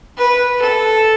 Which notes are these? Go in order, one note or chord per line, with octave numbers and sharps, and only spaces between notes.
B4
A4